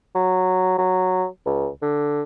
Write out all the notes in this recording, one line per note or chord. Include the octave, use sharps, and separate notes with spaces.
F#3
F#3
C#2
D3